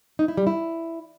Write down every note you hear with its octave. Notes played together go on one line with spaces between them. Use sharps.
D#4
E4
G3
E4